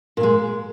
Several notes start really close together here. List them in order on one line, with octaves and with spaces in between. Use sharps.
A#2 A#3 G#3